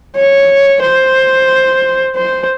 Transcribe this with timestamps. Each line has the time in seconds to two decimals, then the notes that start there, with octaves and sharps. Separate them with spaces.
0.16 C#5
0.82 C5
2.16 C5